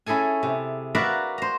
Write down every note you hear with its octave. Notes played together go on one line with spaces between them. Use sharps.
C#4 E4 G#4 A4 G#5
C3
F#4 A#4 B4 D5 E5 F5
C5 A#5